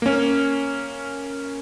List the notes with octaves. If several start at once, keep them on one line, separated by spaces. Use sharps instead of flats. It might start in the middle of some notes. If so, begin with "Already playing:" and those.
A#3 C#4